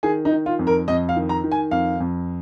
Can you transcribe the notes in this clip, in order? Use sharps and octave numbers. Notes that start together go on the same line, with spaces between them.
D#3 G#4
D#4
D#3
F4
F2
A#4
F2 D#5
F5
D#3
A#5
D#3
G#5
F2 F5
F2